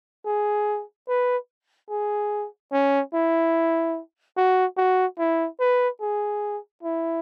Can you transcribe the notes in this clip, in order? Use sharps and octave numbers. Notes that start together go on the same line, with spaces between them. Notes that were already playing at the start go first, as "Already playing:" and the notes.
G#4
B4
G#4
C#4
E4
F#4
F#4
E4
B4
G#4
E4